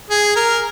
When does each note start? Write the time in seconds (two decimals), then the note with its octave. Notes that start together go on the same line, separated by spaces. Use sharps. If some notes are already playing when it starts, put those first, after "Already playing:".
0.10 G#4
0.36 A#4